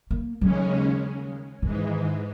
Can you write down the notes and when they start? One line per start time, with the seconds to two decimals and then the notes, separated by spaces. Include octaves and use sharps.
0.11 A#3
0.41 D#2 C#3 F#3 G#3 C#4
1.62 G#2 D#3 E3 G#3